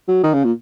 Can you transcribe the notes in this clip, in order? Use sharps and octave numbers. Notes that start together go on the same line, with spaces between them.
F#3
D#3
C#3
A#2